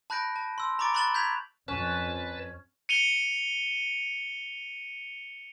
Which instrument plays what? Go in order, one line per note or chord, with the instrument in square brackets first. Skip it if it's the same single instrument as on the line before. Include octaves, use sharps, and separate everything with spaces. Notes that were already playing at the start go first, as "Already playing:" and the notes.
[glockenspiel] A5 B5 F#6 G6 A#6 D7
A5
C6 E6
A#5 B5 C#6 D6 A6 D7
B5 C#6 F#6 A6 E7 F#7
G6 G#6 B6 F7
[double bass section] F2 [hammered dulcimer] C#4 [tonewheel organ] B4 A5
[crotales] C#7 D#7 F7 G7